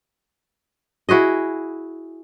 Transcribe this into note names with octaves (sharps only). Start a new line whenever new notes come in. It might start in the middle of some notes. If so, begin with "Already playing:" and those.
E4 F#4 G#4 D#5